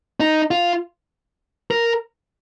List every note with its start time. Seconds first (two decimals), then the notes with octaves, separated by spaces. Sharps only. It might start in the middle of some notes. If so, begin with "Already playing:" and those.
0.20 D#4
0.51 F4
1.71 A#4